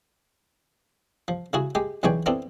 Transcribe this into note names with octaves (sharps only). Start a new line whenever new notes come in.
F3
C#3 E4 F#4 G#4
G#3 G4
B1 E3 G#3 D4 C#5 G5
B3 C4 D4 E4 A4